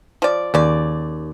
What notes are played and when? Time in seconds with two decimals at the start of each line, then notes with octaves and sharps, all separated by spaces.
0.22 F3 D5
0.54 D#2 C#3 D5